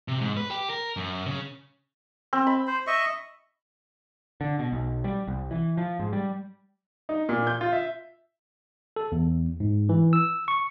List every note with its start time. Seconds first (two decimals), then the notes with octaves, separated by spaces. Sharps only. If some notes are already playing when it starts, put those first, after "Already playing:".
0.08 C3
0.21 G#2
0.37 B4
0.51 G4
0.70 A#4
0.97 F#2
1.27 C#3
2.33 C4
2.47 B5
2.67 C5
2.87 D#5 E5 C#6
4.41 D3
4.59 B2
4.72 B1
5.04 G3
5.27 C2
5.51 E3
5.77 F3
5.99 G#2
6.13 G3
7.09 D#4
7.29 A#2
7.47 G6
7.61 F4
7.72 E5
8.96 A4
9.12 E2
9.60 G#2
9.89 E3
10.13 E6
10.48 C#6